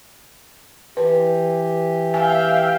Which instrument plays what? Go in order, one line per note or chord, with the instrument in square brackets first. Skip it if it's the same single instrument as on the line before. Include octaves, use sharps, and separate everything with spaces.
[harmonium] E3 G4 [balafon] B4
[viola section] E5 F5 G5 [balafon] G#5